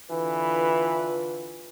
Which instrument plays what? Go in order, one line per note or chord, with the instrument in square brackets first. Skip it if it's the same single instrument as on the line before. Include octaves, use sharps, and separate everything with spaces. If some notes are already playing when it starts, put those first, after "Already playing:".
[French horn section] D3 F4 B4 [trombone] E3